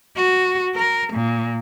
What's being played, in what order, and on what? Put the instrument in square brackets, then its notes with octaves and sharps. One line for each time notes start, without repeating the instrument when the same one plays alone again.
[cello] F#4
A#4
A#2